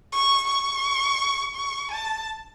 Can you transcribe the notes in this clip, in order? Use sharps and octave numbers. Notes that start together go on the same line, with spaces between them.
C#6
C#6
C#6
A5